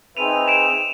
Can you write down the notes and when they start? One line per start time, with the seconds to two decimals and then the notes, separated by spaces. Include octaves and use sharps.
0.16 C4 D#4 G#4 B4 E5 D#7 F7
0.48 D7 E7